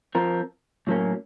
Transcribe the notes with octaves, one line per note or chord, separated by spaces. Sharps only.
F3 C4 F4 A#4
A2 F#3 A#3 C#4